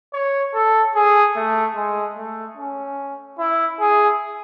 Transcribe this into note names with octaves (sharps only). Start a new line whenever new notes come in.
C#5
A4
G#4
A3
G#3
A3
C#4
E4
G#4